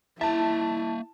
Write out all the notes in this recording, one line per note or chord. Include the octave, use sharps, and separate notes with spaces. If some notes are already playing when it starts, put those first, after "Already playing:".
A#3 E4 E5 A5